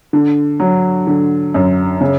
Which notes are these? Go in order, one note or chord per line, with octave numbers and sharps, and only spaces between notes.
D3
F#3
D3
F#2
C#3